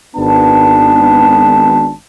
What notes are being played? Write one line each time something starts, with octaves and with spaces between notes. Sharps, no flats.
G#1 B3 D4 A5